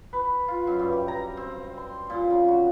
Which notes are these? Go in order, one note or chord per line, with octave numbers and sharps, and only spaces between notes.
B4
F4
F#2
G2
G4
A#5
C4
C6
A#2
C#3
F#4